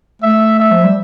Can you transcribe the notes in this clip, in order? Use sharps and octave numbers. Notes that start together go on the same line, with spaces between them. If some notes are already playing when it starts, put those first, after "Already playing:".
A3 E5
E5
F3
G3